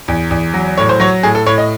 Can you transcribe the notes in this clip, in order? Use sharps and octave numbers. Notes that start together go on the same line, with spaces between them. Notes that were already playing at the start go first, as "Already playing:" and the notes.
E2
E2
F#3
A2 C#5
C5
F#3 C#5
A2 G#4
A4
A2 C#5
D#5